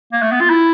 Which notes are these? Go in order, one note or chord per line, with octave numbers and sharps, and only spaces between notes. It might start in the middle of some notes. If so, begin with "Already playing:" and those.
A#3
A3
B3
F4
E4